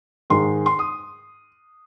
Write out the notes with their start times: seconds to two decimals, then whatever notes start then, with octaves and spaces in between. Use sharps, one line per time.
0.30 G#2 D#3 G#3 C6
0.66 C6
0.79 D#6